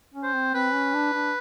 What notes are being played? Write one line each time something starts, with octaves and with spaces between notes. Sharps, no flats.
C#4
C5
C4
C4 B4
C#4
D4
D4